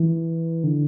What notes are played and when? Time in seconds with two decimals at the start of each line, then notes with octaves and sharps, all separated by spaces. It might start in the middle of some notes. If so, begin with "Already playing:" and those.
Already playing: E3
0.64 D3